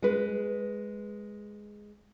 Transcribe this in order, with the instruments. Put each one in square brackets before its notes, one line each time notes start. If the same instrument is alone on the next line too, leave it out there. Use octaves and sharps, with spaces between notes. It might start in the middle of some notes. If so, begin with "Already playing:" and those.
[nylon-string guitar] G#3 B4